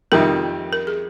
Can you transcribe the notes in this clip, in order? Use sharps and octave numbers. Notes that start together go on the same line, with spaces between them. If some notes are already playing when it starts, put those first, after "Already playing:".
F2 C3 D#3 G3 A#4
A#4
G#4